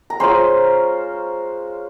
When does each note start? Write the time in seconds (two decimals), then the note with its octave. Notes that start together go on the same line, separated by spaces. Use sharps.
0.10 A#5
0.20 G#3 C#4 F4 C5 C6